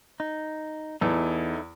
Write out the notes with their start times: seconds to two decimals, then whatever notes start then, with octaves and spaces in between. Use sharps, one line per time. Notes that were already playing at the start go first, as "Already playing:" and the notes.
0.20 D#4
1.01 E2 D#4 E4 A4